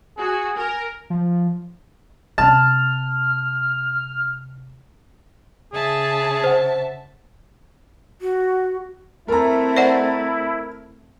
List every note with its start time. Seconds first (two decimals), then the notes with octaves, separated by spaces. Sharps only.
0.18 F#4 G#4
0.57 A#4 G#5
1.10 F3
2.38 C3 A5 F6
5.73 C#3 G#4 E5 A5
6.44 C5 F#5
8.21 F#4
9.28 A3 C4 E4 A#4 A#5
9.77 C5 D5 F#5